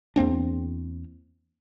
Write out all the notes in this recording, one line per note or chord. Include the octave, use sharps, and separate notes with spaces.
E2 A#3 C4 D4